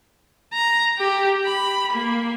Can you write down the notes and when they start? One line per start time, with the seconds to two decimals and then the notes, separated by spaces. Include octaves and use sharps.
0.53 A#5
0.98 G4
1.44 B5
1.93 A#3